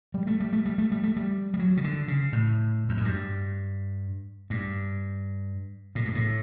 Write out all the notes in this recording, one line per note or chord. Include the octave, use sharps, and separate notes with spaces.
G3
A3
G3
A3
G3
A3
G3
A3
G3
G3
F#3
C#3
D3
C#3
A2
E2
F#2
G2
G2
A2
G2
A2